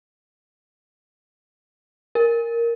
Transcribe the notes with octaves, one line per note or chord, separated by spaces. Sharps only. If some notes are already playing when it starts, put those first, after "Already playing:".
A#4